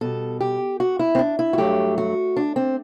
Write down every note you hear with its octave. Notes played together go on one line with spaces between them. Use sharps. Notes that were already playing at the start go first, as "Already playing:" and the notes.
B2 G3 A4
G4
F#4
E4
C4
D4
E4
F#4
G2 F#3 A3 G4
F#4
D4
C4